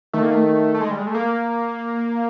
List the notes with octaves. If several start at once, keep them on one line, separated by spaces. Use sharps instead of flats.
D#3 A3
A#3
A3
A3
G#3
G3
G#3
A3
A#3